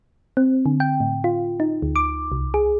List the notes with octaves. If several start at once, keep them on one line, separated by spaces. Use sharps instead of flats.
C4
D3
G5
A2
F4
D#4
D2
D6
C2
G#4